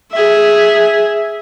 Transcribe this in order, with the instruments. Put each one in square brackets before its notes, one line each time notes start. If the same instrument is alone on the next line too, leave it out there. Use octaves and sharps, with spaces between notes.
[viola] G#4 E5